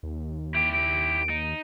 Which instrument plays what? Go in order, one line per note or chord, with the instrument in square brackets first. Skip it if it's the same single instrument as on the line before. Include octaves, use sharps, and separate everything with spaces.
[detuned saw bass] D#2
[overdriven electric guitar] E4 G4 [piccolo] D7
[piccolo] D7
[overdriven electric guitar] D#4